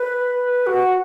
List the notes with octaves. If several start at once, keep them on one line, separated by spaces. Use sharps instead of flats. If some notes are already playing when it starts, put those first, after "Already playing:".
Already playing: B4
F#4